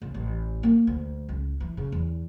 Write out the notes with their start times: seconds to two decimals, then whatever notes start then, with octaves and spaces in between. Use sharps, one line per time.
0.02 C#2
0.14 A1
0.63 A#3
0.87 D2
1.29 C#2
1.60 E3
1.77 C#3
1.92 E2